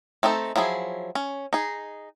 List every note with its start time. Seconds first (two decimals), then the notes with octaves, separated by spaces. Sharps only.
0.23 A3 C4 D#4 A4
0.56 F3 F#3 E4 G#4
1.15 C#4
1.53 D#4 G#4